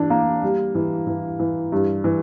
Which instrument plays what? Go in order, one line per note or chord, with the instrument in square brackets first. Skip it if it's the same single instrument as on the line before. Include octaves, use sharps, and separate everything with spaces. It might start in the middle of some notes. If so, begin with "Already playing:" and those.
Already playing: [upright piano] E3 D4
A#3
G3
E3
E3
E3
G2
E3